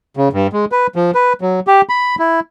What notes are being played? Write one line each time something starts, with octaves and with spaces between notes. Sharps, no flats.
C#3
G2
G#3
B4
F3
B4
F#3
G4
B5
E4